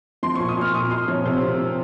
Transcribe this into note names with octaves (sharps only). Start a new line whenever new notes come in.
F3 C6
A#2 C#6
D#6
A#2 F6
A#2 D#6
A#2 C6
F3 C#5
C3 C5
F3
F3